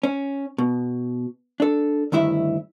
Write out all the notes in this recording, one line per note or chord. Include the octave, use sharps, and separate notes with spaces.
C#4
B2
D4 A4
D2 G2 D#3 E4 E5